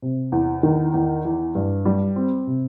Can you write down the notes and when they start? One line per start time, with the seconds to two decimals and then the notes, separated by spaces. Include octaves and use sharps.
0.02 C3
0.32 E2
0.63 D#3
0.94 E2
1.25 E3
1.55 G2
1.85 G3
2.16 C4
2.47 C3